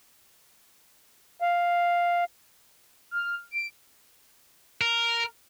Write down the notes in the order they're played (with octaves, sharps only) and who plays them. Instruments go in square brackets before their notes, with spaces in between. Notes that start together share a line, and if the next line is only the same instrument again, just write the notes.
[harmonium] F5
[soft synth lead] F6
D7
[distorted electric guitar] A#4